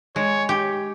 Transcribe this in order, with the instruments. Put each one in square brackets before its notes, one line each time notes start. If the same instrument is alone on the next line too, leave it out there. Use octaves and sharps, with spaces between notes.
[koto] G#3 [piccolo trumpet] C#5
[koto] G4